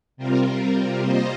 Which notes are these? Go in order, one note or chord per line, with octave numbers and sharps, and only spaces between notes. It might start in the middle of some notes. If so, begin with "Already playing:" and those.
C3 G3 C4 F4 A#4
G3 A#3 F4 C5 D#5